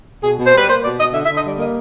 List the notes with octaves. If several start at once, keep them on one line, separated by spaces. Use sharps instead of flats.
B2 G#4
B2
C5
G3 B4
A#3 C5
B2 D5
B2 D#5
D3 E5
E5
D3
D#5
G3 D5
A#3 D#5